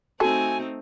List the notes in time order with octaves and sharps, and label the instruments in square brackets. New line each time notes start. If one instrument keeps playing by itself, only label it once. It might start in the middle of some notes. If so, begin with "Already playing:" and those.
[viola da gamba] A3 C4 D#4 [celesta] F#4 [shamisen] A4 [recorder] G#5